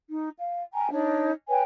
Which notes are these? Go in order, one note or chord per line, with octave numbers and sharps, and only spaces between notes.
D#4
F5
G5 G#5 A#5
D4 D#4 C#5
B4 C#5 G5 G#5